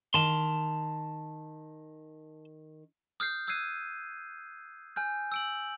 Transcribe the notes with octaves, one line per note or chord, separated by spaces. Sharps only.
D#3 A5 C6
D#6 F6 G6 C7
D#6 E6 F#6 G#6 C7 D#7
G#5 F6 G6
E6 D7 F#7